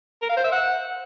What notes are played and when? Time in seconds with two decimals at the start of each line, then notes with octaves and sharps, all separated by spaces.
0.22 A#4
0.29 F5
0.37 C5
0.45 E5
0.52 F#5